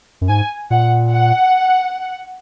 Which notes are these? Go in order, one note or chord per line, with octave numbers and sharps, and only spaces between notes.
F#2
G#2 G#5
A#2 F#5
F#5